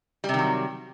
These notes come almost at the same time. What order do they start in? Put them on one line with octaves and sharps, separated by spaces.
G3 C3 D#3 F#3